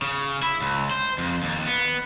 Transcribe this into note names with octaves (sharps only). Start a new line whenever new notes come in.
C#3
E4
C#2
C5
F2
D#2
B3